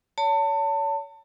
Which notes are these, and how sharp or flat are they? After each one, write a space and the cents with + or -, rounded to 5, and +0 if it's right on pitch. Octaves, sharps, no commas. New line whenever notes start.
C#5 +35 A5 +30